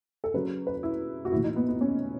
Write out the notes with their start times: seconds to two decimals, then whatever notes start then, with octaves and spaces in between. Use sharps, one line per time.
0.24 A4
0.34 C#3 F#3 B4
0.67 B4
0.83 E4
1.25 F#4
1.32 A2 E4
1.36 E3
1.44 D#4
1.56 B3
1.69 B3
1.81 C#4